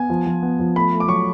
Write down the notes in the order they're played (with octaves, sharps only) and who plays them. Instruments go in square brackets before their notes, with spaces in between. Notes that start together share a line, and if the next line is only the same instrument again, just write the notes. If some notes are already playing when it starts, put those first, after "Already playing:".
Already playing: [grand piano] B3 G#5
F3
F3
B3
F3
A3 B5
A3
D6
F#3 C#6